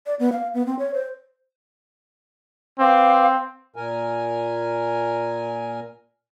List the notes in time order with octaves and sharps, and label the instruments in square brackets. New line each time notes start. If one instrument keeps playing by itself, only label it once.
[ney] D5
B3
F5
B3
C4
C#5
C5
[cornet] C4 [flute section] B4 F5 D6
[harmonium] A#2 A#4 G#5